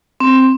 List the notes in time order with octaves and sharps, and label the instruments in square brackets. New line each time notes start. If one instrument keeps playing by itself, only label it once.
[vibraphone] C4